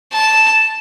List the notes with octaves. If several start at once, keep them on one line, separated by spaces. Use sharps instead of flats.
A5